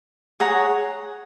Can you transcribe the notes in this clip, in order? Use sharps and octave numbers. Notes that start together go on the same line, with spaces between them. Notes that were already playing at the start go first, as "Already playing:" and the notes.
G#4 C#5 F#5 A#5